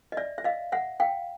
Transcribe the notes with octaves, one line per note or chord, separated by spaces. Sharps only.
D#5
D5 E5
E5
D#5 F5
E5 F#5
F5 G5